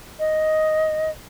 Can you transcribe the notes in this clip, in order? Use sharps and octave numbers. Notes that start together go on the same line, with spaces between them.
D#5